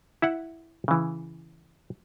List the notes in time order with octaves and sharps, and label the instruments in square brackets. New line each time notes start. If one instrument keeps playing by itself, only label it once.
[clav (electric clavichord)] E4 E5 F#5
C#3 E3